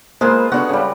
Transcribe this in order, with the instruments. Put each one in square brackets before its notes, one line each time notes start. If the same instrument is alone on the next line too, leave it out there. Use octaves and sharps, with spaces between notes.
[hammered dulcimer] G#3 F4 B4 [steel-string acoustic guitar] A#3 C5
[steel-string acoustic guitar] B3 D4 A4 [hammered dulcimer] F#4
[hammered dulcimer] C#3 G3